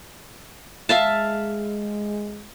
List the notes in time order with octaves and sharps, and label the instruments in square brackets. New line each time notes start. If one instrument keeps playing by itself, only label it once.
[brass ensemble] G#3 [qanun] E5 F5 A5